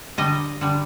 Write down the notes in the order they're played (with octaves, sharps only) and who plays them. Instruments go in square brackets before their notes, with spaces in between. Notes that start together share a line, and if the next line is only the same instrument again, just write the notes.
[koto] D3 G3 D#5
D3 G3